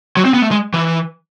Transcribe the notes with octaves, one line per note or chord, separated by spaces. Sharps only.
F#3
C4
B3
A3
G#3
E3